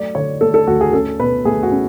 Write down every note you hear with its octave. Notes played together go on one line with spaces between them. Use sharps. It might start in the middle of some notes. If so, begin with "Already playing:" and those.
Already playing: F#3 A3 D5
D3 C#5
A3 A4
A4
D2 F#4
G#4
C#4 A4
B2 B4
A3 G#4
F#4
C#4